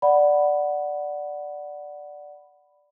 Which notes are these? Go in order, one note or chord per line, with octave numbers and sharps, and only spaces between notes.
D5 F#5 B5